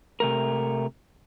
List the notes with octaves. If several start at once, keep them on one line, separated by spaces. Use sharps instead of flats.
C3 A3 A#4